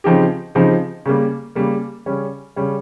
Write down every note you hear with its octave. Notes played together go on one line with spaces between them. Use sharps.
C#3 F3 C4 D#4 G4
C#3 F3 C4 D#4 G4
C#3 G3 A#3
C#3 G3 A#3
C#3 G3 C#4
C#3 G3 C#4